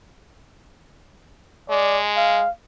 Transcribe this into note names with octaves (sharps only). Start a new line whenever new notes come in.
G#3 D5
F5